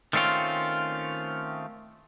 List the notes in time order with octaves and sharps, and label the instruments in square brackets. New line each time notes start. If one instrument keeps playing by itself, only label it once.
[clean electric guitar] D#3 A3 C4 C#4 F4